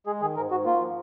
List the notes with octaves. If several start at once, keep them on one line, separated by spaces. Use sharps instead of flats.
G#3 G#4
D#3 G#4
G#2 A#4
G#2 F#4
A#3 F4
F3